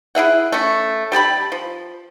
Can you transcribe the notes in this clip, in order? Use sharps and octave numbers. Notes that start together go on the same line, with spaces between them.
E4 G#4 E5 F#5
A3 C#4
G3 G4 A5 B5
F3